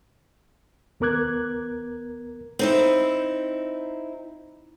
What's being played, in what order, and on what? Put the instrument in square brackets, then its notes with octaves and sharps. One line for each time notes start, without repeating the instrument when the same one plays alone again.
[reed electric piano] D#2 B3 A#4 D6 F#6 G#6
[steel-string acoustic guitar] C4 D#4 E4